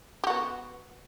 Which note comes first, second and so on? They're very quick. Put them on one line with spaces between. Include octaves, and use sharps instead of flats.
G4 F#4 B3